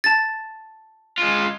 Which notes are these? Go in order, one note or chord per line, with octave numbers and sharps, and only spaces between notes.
A5 A6
G#3 F4